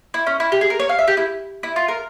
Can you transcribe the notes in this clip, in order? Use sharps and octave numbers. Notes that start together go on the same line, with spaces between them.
E4
C#4
E4
G4
G#4
A#4
C#5
F5
E5
G4
E4
E4
F4
A#4